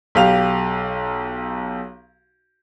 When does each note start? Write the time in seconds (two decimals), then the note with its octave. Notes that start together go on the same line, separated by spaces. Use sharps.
0.15 B1 G4 F5 F7